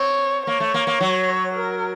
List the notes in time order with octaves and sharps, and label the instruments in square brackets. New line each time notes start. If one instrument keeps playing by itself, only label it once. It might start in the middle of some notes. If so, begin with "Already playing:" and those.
Already playing: [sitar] C4 [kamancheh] C#5
[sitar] A#3 [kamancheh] C#5
[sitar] A3
A#3
A#3
F#3
[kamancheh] A#4